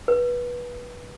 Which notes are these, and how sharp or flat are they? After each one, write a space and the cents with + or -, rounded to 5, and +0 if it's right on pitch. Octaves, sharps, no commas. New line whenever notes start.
B4 -20